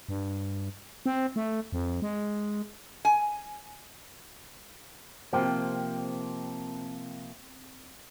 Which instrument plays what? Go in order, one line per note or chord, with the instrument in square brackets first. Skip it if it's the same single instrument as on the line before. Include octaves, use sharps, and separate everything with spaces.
[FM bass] G2
C4
A3
F2
G#3
[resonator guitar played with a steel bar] G#5
[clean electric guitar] C3 F3 A#3 [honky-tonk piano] C4 G5